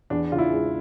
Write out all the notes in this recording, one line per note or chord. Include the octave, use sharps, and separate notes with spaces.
E2 D4
C#3 F4
E4
G#3